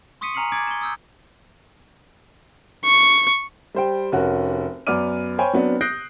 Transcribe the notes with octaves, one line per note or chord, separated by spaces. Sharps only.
C6 C#6 D#6 B6 C#7 D#7
G#5 A#5 F6 C7 C#7 F#7
D6 G#6 A6 D7
E7 G7
D#6 E6 G6
C#6
G3 C5 G5
F1 C#4 F#4 A#4
F#2 B3 D5 D6 F6 D#7
C5 C#5 G5 G#5 B5
F#3 B3 C4 D4
D#6 F#6 G6 A#6 C7 D7